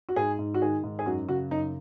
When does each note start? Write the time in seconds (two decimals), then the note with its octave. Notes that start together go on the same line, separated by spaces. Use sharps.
0.09 F#4
0.16 G#2 G#4
0.39 G#2
0.54 F#4
0.61 D#3 G#4
0.84 G#2
0.99 G#4
1.06 F#2 F#4
1.29 C#3 F#4
1.51 F#2 D#4